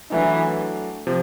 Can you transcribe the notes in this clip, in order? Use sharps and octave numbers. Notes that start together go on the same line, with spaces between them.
E3 F#3 A3 D4
C3 F3